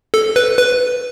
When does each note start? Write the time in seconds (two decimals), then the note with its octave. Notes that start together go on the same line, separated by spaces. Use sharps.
0.14 A4
0.36 B4
0.58 B4